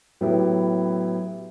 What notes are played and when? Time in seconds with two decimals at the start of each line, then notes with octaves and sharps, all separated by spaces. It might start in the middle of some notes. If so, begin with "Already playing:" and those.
0.21 A2 F#3 B3 E4 G4